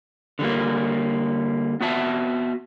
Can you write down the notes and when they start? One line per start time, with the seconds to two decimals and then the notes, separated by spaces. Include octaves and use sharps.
0.39 D3 G3 A#3
1.81 B3 F#4 E5 A5